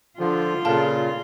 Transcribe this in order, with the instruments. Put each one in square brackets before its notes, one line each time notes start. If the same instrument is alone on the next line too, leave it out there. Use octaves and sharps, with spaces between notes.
[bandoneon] D3 F3 [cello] F4
[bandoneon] A#2 C#3 [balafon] A4 F5 A5